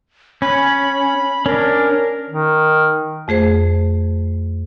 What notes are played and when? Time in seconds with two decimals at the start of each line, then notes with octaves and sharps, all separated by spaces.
0.42 C#4 B5
1.46 C#4 D4 A#4
2.30 D#3
3.28 F2 A3 G#4 C5